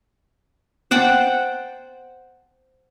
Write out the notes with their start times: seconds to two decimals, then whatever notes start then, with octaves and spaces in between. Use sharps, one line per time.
0.91 C5 F#5 G5 A5